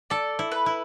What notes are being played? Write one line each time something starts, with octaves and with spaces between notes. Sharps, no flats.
A4 D5
E4
B4
E4